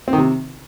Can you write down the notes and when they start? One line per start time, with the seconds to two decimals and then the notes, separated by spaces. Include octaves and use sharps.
0.08 C4
0.13 D#3
0.18 C3